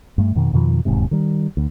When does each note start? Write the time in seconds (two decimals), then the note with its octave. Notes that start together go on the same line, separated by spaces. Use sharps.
0.18 G2 A3
0.35 F2 B2 D#3
0.53 F2 B2 D#3 F3
0.85 E1 D#2 G#2 C3
1.11 D#3 G3
1.57 D2